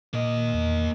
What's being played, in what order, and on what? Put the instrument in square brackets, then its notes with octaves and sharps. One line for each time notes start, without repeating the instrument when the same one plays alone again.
[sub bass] A#2 [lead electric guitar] A#3 D#5
[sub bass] E2